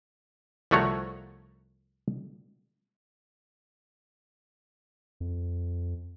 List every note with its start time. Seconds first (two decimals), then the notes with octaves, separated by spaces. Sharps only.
0.71 C2 F3 A3 F#4 C#5 A#5
5.20 F2